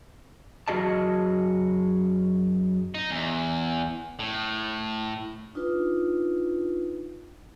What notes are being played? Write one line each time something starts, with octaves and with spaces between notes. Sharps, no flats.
F#2 F#4 G#4 D#5 A5
D#4
E2
A2
D4 D#4 F4 B4